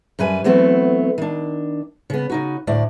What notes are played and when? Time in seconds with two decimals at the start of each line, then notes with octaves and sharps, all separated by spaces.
0.19 F#2 G3 B4 G#5
0.44 E3 F#3 A3 B3 C4 A4
1.18 D#3 D4
2.10 C#3 B3
2.30 C#3 D#4 F#4
2.67 D2 A2 D5